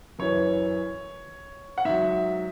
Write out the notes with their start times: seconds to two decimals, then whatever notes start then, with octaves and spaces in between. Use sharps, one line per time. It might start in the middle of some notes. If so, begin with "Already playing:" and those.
0.19 F#2 E3 C#5
1.78 F#5
1.85 G#2 F#3 E5